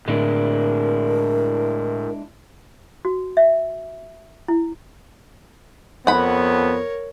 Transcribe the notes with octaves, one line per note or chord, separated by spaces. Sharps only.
A2 D3 G#3 D4 E4 A#4
F#4
E5
E4
F2 B3 A#4 C#5 F#5 B5